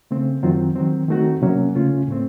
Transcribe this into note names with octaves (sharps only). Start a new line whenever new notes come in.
C#3 A3 C4
F#2 D#3 F#3 C4 F4
D#3 F#3 C4
D#3 A3 C4 D#4 F#4
C3 F#3 A#3 C#4
C#3 A3 C#4 F4
A2 A3 C4